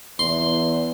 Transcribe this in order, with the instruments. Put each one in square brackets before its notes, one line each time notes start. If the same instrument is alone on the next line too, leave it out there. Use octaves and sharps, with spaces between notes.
[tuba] E2 [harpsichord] C6